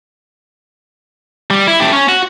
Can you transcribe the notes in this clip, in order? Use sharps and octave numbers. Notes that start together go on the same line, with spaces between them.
G3
E4
A3 G4
C#4
F#4